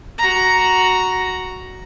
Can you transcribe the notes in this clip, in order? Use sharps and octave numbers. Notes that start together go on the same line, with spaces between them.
F#4 A#5